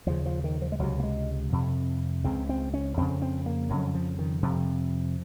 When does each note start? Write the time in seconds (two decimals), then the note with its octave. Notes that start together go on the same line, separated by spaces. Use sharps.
0.06 D#2 C#3 F3
0.26 F3
0.44 D#3
0.62 F3
0.72 G#3
0.79 C#2 C3 F#3
1.00 A#3
1.03 G#3
1.52 F2 C3
2.24 C#2 C#3 C4
2.49 C4
2.74 C#4
2.97 F2 C#3 C4
3.22 C4
3.46 A#3
3.70 F2 C#3 F#3
3.95 F3
4.19 D#3
4.42 F2 C3 F3